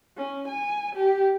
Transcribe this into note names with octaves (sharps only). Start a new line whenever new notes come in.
C#4
G#5
G4